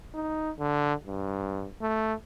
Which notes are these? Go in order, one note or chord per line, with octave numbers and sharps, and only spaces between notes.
D#4
D3
G2
A3